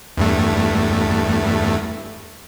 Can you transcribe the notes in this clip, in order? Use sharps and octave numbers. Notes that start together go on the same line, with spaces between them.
E2 G2 A3